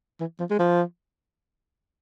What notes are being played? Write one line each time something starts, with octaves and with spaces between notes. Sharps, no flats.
E3
F3
G#3
F3